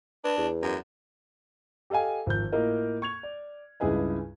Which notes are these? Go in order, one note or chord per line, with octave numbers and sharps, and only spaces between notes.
D4 B4
E2
F#2
G4 A4 D#5 F5 G#5
G#1 F3 G6
A2 A#3 F4 A#4 D#5
C#6 G#6 F7
D5
C#2 G2 E4 G#4 B4 D#5